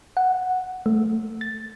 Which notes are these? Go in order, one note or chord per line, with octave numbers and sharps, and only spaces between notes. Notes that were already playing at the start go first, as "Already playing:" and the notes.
F#5
A3
A6